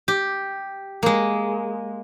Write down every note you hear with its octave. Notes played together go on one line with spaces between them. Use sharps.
G4
G#3 A#3